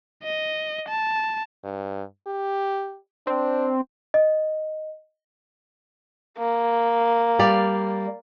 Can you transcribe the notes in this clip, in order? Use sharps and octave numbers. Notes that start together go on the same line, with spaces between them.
D#5
A5
G2
G4
C4 D4
D#5
A#3
G3 D5 F5